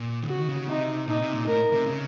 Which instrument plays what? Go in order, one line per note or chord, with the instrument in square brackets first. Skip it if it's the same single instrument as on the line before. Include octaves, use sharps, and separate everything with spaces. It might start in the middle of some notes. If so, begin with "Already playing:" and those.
Already playing: [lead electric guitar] A#2
D#3
[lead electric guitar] C#3 [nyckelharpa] F#4
[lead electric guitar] D#3
C#3
[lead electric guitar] C3 [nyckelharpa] D#4
[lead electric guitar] A#2 [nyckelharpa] D#4
[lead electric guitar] C3
A#2
[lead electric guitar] A2 [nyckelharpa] A#4
[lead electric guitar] C3
C#3